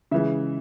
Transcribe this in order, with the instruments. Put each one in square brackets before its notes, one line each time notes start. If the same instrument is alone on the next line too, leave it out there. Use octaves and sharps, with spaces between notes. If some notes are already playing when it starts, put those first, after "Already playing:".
[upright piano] C#3 E3 G#3 E5